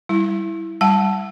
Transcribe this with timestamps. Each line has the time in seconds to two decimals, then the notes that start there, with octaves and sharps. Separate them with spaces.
0.09 G3 E4
0.81 G3 F#5 A5